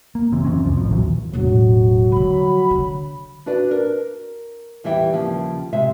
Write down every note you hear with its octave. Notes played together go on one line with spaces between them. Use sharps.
A#3
F#1 C#3 E3 C4
F#2 E3 C4 C#4
C2 F2 F3
A1 F3
A#1 D#2 E3 F#3
E1 A2 F#3
D3 F3 B5
D3
D4 F#4 B4 D5
A#4
E2 E3 G3 E5 G5
D#2 C#3 F3
C3 G#3 E5